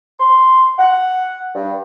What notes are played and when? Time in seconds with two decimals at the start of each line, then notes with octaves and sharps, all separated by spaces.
0.20 C6
0.79 F#5
1.55 G2